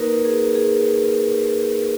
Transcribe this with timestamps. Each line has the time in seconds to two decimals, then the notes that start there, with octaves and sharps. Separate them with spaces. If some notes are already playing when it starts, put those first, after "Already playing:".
Already playing: A#3 D#4 F#4 A#4 B4
0.25 G#4
0.55 G#4